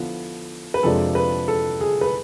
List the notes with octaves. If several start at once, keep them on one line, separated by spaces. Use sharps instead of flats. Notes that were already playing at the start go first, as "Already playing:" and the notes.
Already playing: D3 F3 B3 E4
B4
F2 C3 F3 G#3 D4 A4
B4
A4
G#4
B4